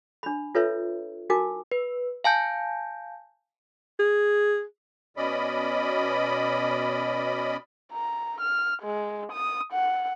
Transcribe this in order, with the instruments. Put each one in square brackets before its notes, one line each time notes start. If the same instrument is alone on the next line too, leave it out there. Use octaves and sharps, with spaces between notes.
[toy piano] D4 B5
F4 A4 B4 C#5 E5
D#4 F#4 A#4 G#5 D6
[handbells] B4
F5 G#5 A5 G6
[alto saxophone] G#4
[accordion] B2 C#4 D5 D#5 B5
[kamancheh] A#5
F6
G#3
D#6
F#5